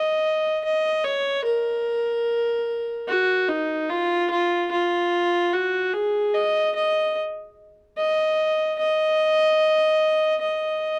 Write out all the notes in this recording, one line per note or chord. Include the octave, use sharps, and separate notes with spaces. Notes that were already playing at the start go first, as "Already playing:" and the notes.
Already playing: D#5
D#5
C#5
A#4
F#4
D#4
F4
F4
F4
F#4
G#4
D#5
D#5
D#5
D#5
D#5